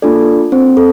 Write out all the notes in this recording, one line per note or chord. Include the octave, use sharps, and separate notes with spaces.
A#3 D4 F4 A4 D5
C4 C5
A4